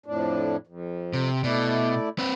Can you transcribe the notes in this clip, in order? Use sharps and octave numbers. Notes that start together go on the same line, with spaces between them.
F2 A2 D4
F2
C3
B2 A3 E4 D5
C4 B4